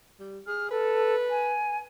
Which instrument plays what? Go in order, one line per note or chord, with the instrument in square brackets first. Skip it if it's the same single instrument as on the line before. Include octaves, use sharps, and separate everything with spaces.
[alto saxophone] G3
[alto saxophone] G#4 [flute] F6
[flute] A4 [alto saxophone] B4
[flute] G#5